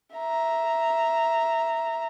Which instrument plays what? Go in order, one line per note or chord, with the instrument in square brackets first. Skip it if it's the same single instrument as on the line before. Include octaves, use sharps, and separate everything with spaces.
[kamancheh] E5 A#5